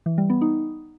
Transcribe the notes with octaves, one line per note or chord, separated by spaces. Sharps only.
E3
G3
B3
D#4